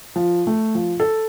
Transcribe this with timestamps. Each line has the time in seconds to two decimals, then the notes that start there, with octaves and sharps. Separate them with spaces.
0.16 F3
0.47 A3
0.75 F3
1.00 A4